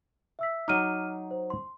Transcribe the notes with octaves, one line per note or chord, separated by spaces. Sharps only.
E5 E6 B6
F#3 D#4 D6 F6 D#7
C5
C6